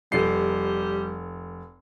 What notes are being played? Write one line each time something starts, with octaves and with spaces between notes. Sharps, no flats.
F1 G3 C7